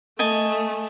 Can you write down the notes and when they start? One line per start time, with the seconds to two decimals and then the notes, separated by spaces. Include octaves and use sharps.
0.19 A3 D#5 G#5 A5